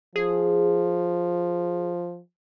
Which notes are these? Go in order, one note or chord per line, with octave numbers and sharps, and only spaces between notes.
F3 G#4